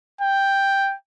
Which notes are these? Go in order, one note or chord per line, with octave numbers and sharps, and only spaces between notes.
G5